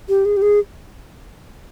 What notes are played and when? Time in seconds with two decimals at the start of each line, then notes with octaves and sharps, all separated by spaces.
0.09 G4
0.25 G#4
0.37 G4
0.42 G#4